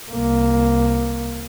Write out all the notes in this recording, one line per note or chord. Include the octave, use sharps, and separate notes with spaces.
C2 A#3